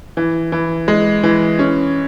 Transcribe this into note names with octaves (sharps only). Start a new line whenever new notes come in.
E3
E3
G#3
E3
C#4